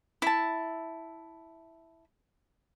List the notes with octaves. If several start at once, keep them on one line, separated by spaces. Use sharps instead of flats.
E4 A5